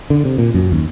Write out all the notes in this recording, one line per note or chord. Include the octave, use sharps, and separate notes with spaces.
D3
C3
A#2
F#2
D#2